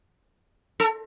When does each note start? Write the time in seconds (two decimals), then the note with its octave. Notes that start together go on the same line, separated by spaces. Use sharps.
0.80 A4